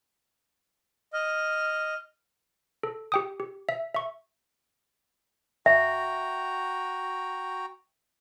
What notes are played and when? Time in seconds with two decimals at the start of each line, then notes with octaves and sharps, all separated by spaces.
1.13 D#5 F6
2.83 A4
3.12 G4 G5 D#6
3.40 G4
3.69 E5
3.94 E5 C#6
5.66 F#4 E5 G5 A#5